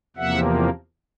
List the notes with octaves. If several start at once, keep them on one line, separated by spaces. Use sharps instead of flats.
E2 C3 F3 A#3 E5 F#5